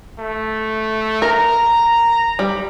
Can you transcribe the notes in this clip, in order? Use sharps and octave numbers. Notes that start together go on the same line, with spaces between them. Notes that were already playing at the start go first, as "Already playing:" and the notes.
A3
A#4 A#5
G3